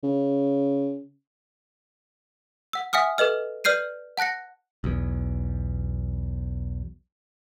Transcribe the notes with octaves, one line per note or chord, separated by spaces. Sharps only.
C#3
F#5 E6
E5 F#5 G#5 D#6 F6
A4 B4 D#5 F6
B4 D5 F6 G6 C7 D#7
F#5 A5 F#6 A#6 C#7
B1 E2